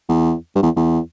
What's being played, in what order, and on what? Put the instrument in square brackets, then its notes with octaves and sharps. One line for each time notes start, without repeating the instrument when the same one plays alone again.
[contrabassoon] E2
G2
E2
E2